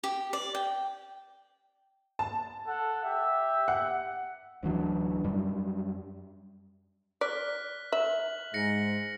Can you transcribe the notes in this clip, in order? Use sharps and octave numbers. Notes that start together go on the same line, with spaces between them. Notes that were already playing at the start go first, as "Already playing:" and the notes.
G4
D5
G5
A5
A4 F#5
G4 E5
F#5
D1 E3 F#3 D4
F#2 G3
D5 F6 F#6 B6
E5 F#7
G#2 A#6 C#7